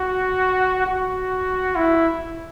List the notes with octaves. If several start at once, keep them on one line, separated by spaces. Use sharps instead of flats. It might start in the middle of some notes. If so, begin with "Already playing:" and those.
Already playing: F#4
F#4
E4